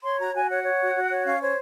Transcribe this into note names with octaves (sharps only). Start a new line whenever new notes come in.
C#5 C6
F#4 A#5
F#4 G#5
C#5 F#5
C#5
F#4
F#4
C#5
C#4 F5
C5 C#5